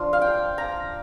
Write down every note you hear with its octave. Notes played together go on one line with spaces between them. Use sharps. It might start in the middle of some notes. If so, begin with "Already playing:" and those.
Already playing: F3 D4 F4
F5
G5
A#5